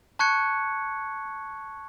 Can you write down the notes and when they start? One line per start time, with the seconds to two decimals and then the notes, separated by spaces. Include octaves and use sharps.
0.19 A5 C#6 F#6 G#6 C#7